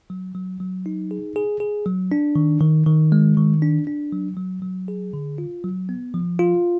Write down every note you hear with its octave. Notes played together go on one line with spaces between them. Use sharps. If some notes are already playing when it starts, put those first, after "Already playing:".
F#3
F#3
F#3
D#4
G#4
G#4
G#4
F#3
D4
D#3
D#3
D#3
G#3
D#3
D4
D4
F#3
F#3
F#3
G#4
D3
F4
F#3
B3
F3
F4